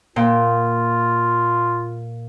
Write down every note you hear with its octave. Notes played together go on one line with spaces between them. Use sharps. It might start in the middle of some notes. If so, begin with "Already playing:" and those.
A#2 F4 G5